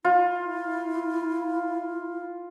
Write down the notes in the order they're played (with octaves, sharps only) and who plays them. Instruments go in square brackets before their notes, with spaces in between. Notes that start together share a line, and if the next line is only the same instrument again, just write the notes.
[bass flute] E4 [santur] F4